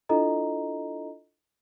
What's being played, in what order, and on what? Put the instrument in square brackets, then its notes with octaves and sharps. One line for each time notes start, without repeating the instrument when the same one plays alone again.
[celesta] D4 E4 F4 A4 D#5 A#5